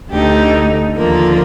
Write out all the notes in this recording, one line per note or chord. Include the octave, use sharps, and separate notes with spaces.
D2 D3 A3 D#4 G4
D#2 D3 F3 A#3 A#4